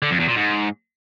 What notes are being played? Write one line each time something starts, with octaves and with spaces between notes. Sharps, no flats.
D3
F2
E2
A#2
G#2